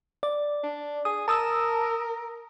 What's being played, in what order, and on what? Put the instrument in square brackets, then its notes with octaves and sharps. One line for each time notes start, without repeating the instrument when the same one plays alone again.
[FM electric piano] D5
[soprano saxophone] D4
[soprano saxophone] G#4 [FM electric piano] D#6
[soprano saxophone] A#4 [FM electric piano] A5 D#6 E6